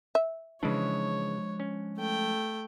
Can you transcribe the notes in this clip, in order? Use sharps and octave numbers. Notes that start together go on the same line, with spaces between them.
E5
C#3 E3 F3 G#3 D4 C#5
C#4
A3 G5